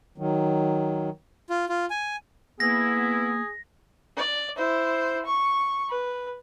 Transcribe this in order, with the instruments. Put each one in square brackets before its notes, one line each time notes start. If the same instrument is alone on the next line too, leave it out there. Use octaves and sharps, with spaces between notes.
[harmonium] D#3 F#3
[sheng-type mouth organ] F4
F4
G#5
[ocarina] A#3 [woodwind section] B3 E4 [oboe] G#4 [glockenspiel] A#6
[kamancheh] D5
E4 C5
C#6
B4